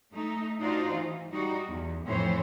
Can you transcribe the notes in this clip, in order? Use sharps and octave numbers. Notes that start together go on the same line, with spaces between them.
A3 D#4
D4 D#4 F4 F#4 C5
E3
G3 D#4 F#4
E2
F2 A2 E3 C5 C#5